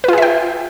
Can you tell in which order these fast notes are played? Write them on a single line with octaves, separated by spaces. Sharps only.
B4 F4 G#4 E5 G5